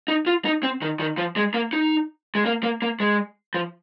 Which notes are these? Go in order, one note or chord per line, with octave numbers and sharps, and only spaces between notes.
D#4
F4
D#4
C4
D#3
D#3
F3
G#3
A#3
D#4
G#3
A#3
A#3
A#3
G#3
F3